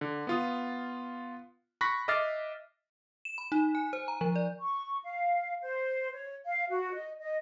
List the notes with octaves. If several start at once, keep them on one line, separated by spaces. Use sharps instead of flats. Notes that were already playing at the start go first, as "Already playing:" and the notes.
D3
B3 F4 D#6
B5 C#6 F#6 A#6 B6
D#5 E5 D6 F6 A6 C7
E7
B5
D#4
G#5
C5
A#5
F3
D5
C#6
F5
C5
C#5
F5
F#4
D#5
D#5